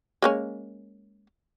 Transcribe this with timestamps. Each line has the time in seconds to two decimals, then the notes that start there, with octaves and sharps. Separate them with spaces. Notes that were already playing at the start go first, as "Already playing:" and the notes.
0.22 G#3 A#3 C#4